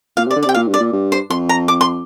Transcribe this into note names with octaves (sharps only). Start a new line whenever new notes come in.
A#2 F5
C3
D5
D3
D5
C3
G5
A#2 F5
G2
D5
A#2
G2
C5
F2 C6
A#5
D6
C6